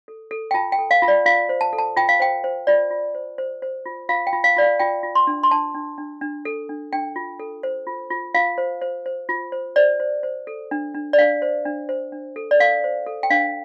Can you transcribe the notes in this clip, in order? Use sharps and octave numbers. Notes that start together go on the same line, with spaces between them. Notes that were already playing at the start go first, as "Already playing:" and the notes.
A4
A4
G5
F4 A5
G5
A4
F5
F4
D5
F4 F5
C5
A5
A4
A5
F4 G5
F5
C5 G5
C5
F4 D5
F4
C5
C5
C5
F4
F4 F5
G5
F4
F5
F4 D5
F5
F4 G5
F4
C6
D4
C6
D4 A5
D4
D4
D4
A4
D4
D4 G5
F4
A4
C5
F4
F4
F4 F5
C5
C5
C5
F4
C5
C5 D5
C5
C5
A4
D4
D4
D5
D4 F5
C5
D4
C5
D4
A4
D5
A4 F5
C5
A4
G5
D4 F5